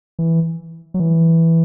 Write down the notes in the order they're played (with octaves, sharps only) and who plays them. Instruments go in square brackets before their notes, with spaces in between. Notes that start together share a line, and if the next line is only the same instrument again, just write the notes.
[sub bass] E3
F#3
E3